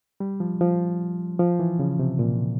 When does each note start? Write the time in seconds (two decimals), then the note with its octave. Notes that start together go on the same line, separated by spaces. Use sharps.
0.20 G3
0.40 F3
0.61 F3
1.39 F3
1.60 E3
1.79 C#3
1.99 C3
2.19 A#2